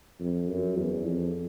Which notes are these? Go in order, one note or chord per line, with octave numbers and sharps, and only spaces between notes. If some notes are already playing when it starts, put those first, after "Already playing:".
F2
F#2
E2
F2